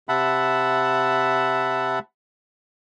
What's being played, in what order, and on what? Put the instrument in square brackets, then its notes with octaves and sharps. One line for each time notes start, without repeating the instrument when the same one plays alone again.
[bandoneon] C3 E5 F#5 A5 B5